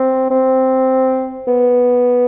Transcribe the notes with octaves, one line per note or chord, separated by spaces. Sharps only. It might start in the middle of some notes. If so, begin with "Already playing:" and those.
Already playing: C4
C4
B3